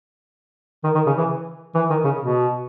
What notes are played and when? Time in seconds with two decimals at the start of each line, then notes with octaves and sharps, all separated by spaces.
0.84 D#3
0.95 D#3
1.06 C#3
1.18 E3
1.75 E3
1.90 D#3
2.04 C#3
2.20 B2